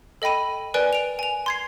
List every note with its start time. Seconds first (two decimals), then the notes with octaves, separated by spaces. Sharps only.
0.22 A4 D#5 G5 B5 D#7
0.74 A#4 B4 D5 G#5 F#6 D7
0.93 D7 F7
1.19 G#5 F7
1.46 C6 G#6 C7